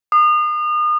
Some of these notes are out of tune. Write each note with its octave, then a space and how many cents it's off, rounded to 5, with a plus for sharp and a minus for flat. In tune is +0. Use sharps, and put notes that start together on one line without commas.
D#6 -35